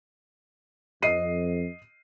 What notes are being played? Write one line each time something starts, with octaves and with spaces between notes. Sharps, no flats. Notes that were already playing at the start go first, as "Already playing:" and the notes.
F2 D#5 C7 D#7